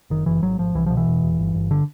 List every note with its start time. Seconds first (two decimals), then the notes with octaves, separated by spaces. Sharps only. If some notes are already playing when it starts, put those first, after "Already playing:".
0.10 F#1 D#3
0.26 F#1 E3
0.42 G#1 F#3
0.58 G#1 F3
0.75 C2 E3
0.86 B2 F3
0.97 E3
1.07 E1
1.23 E1
1.39 G1
1.55 G1
1.71 D3